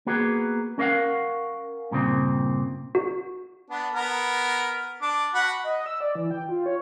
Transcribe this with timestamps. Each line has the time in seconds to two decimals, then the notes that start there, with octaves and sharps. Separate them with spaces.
0.07 A#3 B3 F#4 G#4
0.78 C#4 A#4 D#5 F5 F#5
1.91 G2 A#2 C#3 C4
2.95 F#4
3.70 B3 D4
3.94 B3 A#4
5.02 D4 D6
5.34 F#4 F#5 B5
5.64 D#5
5.86 E6
6.00 D5
6.15 E3
6.31 G5
6.49 F4
6.66 C#5